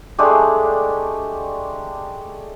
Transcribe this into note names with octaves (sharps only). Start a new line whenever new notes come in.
G#3 A3 D4 G4